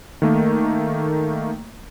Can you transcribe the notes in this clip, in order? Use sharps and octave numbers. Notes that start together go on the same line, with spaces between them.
D#3 A3 A#3